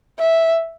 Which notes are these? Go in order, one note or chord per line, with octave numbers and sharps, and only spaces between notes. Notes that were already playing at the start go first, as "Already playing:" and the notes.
E5